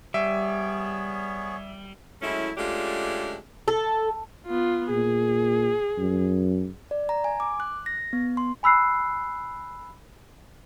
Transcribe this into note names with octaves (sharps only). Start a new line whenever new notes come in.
G3 B3 G#4 C#5 E5
F#3 G#3 A3 C#4 E4
G#3 A3 C#4 D4 F4 G4
A4
B3 F4
A#2 G#4
F#2
D5
A#5
G#5
D6
F#6
A#6
B3
C6
G#5 B5 E6 F#6 C7